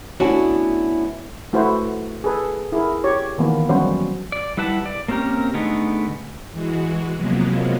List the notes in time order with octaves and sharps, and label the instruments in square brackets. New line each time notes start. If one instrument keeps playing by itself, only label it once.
[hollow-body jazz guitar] A3 B3 C#4 D4 E4 F#4
[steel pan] A3 E4 F#4 B4 C5
G#4 A4 B4
E4 G#4 A#4
G4 C#5
D#3 E3 A#3 B3
F#3 G3 B3 C#4 F#4 C5
[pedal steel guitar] D5
G3 E4 B4 F#5 A5
D5
A#3 C4 C#4 G4 A#4
D3 G#3 A3 B3 D#4
[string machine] E3 G#3 F#4
C3 F3 F#3 G#3 A#3 B3